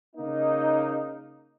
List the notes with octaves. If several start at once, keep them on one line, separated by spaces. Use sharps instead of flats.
C#3 A#3 D#4